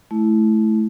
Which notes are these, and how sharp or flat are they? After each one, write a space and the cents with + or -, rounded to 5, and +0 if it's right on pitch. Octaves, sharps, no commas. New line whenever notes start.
A3 -20 E4 +0